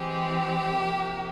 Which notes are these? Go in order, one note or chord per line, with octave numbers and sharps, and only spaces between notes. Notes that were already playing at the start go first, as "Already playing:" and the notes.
Already playing: E3 G#3 C4 G4
C3 F3 A#3